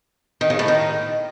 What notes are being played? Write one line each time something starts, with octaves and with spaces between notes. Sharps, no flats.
D#3
C#3
A2
D#3